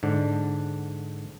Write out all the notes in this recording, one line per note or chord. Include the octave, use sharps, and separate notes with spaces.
G#2 D3 D4